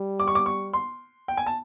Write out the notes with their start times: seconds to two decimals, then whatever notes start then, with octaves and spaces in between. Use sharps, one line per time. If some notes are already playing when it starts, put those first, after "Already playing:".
Already playing: G3
0.20 D6
0.28 C#6
0.35 D6
0.46 C#6
0.73 C6
1.28 G5
1.37 G#5
1.46 A5